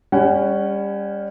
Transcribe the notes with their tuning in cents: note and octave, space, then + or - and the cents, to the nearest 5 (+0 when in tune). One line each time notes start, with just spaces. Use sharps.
G3 +30 C#4 +0 F#5 +30